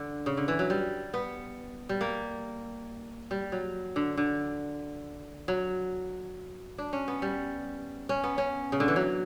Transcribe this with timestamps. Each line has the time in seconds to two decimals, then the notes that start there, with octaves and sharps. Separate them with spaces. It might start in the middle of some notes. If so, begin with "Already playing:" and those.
Already playing: D3
0.26 C#3
0.37 D3
0.48 E3
0.59 F#3
0.70 G3
1.14 B3
1.89 G3
2.01 A#3
3.31 G3
3.52 F#3
3.96 D3
4.17 D3
5.48 F#3
6.78 D4
6.93 C#4
7.08 B3
7.22 G3
8.09 C#4
8.24 B3
8.38 C#4
8.72 C#3
8.80 D3
8.88 E3
8.96 F#3